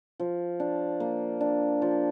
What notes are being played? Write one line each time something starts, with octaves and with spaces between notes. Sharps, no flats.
F3
D4
A#3
D4
F3